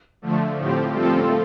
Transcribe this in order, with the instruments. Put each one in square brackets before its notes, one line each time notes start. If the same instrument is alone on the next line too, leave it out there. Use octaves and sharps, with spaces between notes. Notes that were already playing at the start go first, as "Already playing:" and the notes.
[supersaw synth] D3 F3 A3
A2 F3 C4 G4
[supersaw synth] F3 C4 F4 A4 [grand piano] G3
[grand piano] A3
C4
A3